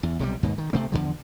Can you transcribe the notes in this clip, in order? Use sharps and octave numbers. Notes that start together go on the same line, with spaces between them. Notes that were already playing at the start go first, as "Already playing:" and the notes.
E2
B1 C3 F3 G3
D#2 G#2 B2
D#3
C3 A3 C4
E2 G#2 D3 F3